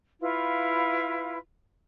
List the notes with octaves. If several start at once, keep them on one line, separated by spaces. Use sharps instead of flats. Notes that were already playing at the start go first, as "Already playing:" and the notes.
E4 F4 B4 F5